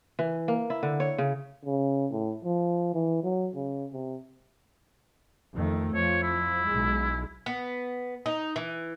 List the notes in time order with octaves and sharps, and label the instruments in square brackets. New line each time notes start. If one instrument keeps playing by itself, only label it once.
[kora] E3
A#3
E4
D3
C#5
C#3
[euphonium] C#3
A2
F3
E3
F#3
C#3
C3
[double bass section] F2 D#3 A3
[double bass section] F2 F3 [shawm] C#5
[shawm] E4
[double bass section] B1 G#3
[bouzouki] B3
D#4
E3